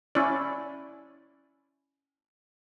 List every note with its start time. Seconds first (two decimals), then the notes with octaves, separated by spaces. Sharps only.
0.15 C#4 E4 D5